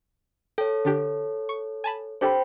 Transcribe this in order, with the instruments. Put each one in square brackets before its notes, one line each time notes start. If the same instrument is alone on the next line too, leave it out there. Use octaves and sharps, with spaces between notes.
[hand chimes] A4 C#5 [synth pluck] G5
[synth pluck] D3 D4 G4
C#6
G#5 A5 B5
[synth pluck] D4 G4 A4 [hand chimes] C5 G5 B5